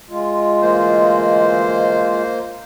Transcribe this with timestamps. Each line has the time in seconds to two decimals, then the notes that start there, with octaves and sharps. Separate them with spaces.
0.10 G#3 F4
0.62 D2 E3 A#3 C5 D#5